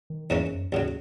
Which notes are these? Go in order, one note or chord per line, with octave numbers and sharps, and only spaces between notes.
D#3
E2 G#2 E3 A#3 C#4 E4
F#2
D#2 G#2 C#3 F#3